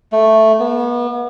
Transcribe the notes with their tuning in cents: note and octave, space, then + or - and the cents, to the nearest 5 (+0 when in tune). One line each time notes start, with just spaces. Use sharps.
A3 +0
B3 -35